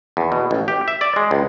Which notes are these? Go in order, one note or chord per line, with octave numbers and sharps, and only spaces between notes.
E2
B2
A1
G4
E5
D5
G#3
C#2